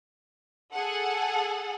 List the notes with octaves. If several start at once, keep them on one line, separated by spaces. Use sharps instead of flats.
G#4 A4 F#5